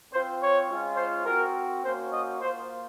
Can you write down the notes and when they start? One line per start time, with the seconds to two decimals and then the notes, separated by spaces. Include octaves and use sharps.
0.11 C4 C5
0.15 F4
0.40 C#5
0.68 G#3 C#4 F4
0.97 C5
1.25 C4 F#4 A#4
1.83 A#3 C#4 F#4 C5
2.11 D#5
2.39 A#3 F4 C5